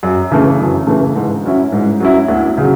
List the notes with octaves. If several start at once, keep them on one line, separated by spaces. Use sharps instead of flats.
F#2
C#3 E3 A3
F#2
C#3 E3 A3
G#2
F#3 C#4 E4
G#2
F#3 C#4 E4
D2
C#3 F#3